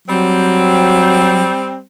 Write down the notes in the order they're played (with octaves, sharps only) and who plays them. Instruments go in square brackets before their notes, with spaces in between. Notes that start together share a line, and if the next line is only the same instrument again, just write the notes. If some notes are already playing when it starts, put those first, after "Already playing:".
[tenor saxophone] F#3 [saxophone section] G3 C4